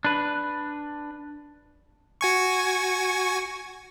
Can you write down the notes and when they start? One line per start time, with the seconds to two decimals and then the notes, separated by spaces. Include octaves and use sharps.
0.05 D4 B4
2.21 F#4 G#5 C#6